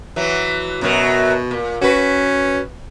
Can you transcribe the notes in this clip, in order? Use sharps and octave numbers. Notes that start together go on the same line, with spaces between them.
E3 F#3
F#2 B2 F#3
A#2
C#4 F#4 B4